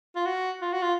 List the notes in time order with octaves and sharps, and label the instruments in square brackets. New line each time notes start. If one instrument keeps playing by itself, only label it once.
[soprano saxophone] F4
F#4
F4
F#4
F4